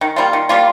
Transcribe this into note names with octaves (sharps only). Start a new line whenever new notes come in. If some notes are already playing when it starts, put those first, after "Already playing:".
D#3
G3 A#3 F4
D#3
G3 A#3 F4